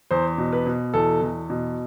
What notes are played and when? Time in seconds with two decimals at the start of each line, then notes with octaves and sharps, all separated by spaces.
0.11 E2 C5
0.38 B2
0.53 B4
0.66 B2
0.94 E2 A4
1.22 E2
1.50 B2